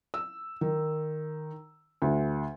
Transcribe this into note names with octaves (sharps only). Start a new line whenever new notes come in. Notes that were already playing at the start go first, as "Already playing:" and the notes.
E6
D#3
D2